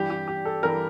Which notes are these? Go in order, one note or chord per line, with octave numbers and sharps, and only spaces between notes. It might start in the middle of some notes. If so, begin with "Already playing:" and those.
Already playing: G2 E3 G3 G4
G4
G4
A4
G2 E3 G3 A#4